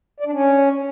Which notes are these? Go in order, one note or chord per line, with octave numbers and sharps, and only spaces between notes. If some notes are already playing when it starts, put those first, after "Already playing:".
D5
D4
C#4